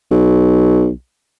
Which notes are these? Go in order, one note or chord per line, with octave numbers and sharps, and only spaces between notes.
B1